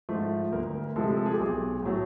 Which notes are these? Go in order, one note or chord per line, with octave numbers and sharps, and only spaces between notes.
G#2 F3 A3
D2 A#4
A#4
C3 F3 G#3 A4
A4
G#4
G4
B1 G#4
A2 F#3 A3